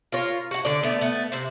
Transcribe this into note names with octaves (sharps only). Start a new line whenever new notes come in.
F4 A#4 C#5
F#4 F#5
D3 D5
A3 B3
A3 B3
C3 C5